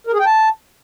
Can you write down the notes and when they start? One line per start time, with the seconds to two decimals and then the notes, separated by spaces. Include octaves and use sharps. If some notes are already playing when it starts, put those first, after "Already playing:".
0.07 A#4
0.13 G#4
0.20 G5
0.26 A5